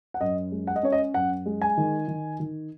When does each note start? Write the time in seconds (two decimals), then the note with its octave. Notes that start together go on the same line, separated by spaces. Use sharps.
0.14 F#5
0.21 F#2 D#5
0.52 G#3
0.67 F#5
0.76 D#5
0.83 C#4 C#5
0.92 D#5
1.14 F#2 F#5
1.46 G#3
1.62 G#5
1.78 D#3
2.08 D#3
2.40 D#3